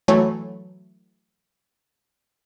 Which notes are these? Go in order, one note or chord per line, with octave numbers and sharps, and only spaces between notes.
E3 F#3 A3 C#5